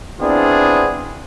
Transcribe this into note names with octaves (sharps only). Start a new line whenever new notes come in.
B3 C4 D4 E4 F4 G#4